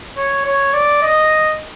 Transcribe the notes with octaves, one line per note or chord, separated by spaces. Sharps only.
C#5
C#5
D5
D#5